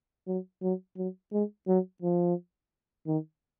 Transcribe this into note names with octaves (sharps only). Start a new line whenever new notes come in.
F#3
F#3
F#3
G#3
F#3
F3
D#3